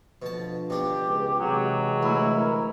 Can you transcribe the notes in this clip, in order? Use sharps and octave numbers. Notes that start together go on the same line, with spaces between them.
B2 D3 F3 A5
B2 D4 G4
C#2
C3 E3 F#3 G#3
D2 E4
A#4